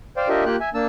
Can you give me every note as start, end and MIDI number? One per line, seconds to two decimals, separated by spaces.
0.17 0.29 72
0.17 0.29 74
0.17 0.29 77
0.17 0.29 79
0.29 0.44 62
0.29 0.44 65
0.29 0.44 67
0.29 0.44 70
0.29 0.44 75
0.29 0.44 76
0.46 0.56 58
0.46 0.56 65
0.46 0.56 67
0.46 0.56 79
0.46 0.56 90
0.60 0.69 76
0.60 0.69 80
0.74 0.87 58
0.74 0.87 62
0.74 0.87 81
0.74 0.87 88